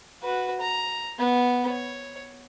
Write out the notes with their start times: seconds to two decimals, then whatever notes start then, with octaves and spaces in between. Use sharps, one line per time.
0.23 F#4 B4
0.61 A#5
1.19 B3
1.69 C#5